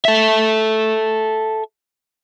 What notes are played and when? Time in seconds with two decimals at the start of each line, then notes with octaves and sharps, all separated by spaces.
0.05 A4 E5